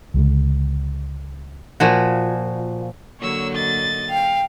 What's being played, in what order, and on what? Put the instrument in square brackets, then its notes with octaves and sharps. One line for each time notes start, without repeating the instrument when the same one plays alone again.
[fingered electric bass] C#2 D3 F#3 G#3
[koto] A#2 F3 F#4
[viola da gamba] D3 F#3 A#3 [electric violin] C#5 E6
[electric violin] D#5 A6
[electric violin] F5 [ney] G5